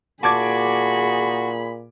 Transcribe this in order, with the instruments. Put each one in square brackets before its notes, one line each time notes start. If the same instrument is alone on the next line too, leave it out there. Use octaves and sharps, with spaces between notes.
[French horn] A#2 [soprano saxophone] F#4 [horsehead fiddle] G#4 B5 [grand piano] A5 D6 G#6